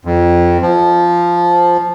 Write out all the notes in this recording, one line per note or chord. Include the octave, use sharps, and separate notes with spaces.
F2
F3